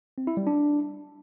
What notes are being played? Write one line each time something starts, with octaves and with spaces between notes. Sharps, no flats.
C4
E4
G3
D4